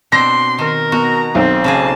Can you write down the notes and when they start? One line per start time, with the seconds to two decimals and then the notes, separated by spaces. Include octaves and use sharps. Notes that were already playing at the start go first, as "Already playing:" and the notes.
0.12 B2 C4 D4 C6 A#6
0.59 D#3 A#4
0.92 B2 F#4 A#5
1.35 B1 C4
1.64 C#3 A#3 G#4 A5